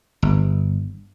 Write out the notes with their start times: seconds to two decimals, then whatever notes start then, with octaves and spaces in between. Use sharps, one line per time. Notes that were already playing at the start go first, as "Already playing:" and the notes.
0.22 G1